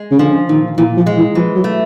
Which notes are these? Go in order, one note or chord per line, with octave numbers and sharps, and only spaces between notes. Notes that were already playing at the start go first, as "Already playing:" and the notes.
Already playing: G#3
C#3
D3 F3
A#2 D#3
A#2 E3
F3
G#3
E3
E3 F3
F#3
A3